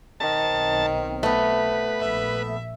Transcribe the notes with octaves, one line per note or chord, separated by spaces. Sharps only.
B1 D#3 C4 A5
A3 B3 B4
A#1 E5